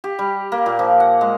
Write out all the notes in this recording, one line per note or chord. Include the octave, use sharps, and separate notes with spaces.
G4
G3
A#3
A#2
F3
F#5
G#3